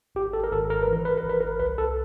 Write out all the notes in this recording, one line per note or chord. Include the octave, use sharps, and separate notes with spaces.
G#1 G4
A4
A#4
G#1 A4
A#4
B4
E3
A#4
B4
A#4
G#1
B4
A#4
C2 B4
A4